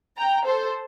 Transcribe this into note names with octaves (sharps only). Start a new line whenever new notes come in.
G5 A#5
A4 C5